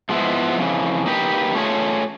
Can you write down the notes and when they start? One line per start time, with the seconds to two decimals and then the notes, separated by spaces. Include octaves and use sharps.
0.09 G#2 F3 G#3 B3 E4
0.58 F2 C#3 E3
1.06 A#3 D#4 G4 B4
1.55 A3 C#4 F4 G#4 C#5